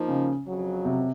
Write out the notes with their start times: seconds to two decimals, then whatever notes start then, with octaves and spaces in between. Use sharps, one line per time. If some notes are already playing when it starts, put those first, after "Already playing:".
Already playing: F3 A#3 D#4
0.08 C#3
0.46 F2 C#3 F#3
0.85 C3